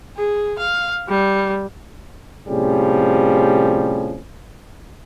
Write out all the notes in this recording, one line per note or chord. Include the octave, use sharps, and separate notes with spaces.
G#4
F5
G3
A2 C3 F3 G3 C#4 G#4